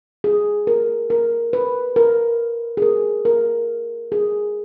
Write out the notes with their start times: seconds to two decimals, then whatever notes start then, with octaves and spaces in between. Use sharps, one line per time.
0.24 G#4
0.67 A#4
1.10 A#4
1.53 B4
1.96 A#4
2.77 G#4
2.82 A#4
3.25 A#4
4.12 G#4